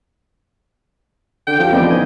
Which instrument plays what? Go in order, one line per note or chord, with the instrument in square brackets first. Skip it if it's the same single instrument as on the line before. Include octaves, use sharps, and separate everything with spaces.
[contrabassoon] D3 [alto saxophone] G5
[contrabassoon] F3 [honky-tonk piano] C4 G4
[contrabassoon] F2 [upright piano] E3 F3 C4 [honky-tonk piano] B3 D5 D#5
[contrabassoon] D#3 [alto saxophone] G#5